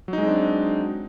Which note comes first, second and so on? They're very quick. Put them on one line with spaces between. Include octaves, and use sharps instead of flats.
F#3 D#4 G#3 C4 D4